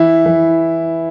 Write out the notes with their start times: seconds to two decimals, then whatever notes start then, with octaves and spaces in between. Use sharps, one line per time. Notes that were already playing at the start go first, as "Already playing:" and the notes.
Already playing: E3 E4
0.25 E3